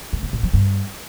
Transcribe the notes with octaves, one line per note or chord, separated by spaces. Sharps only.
A3
G#2
A2
F3
G2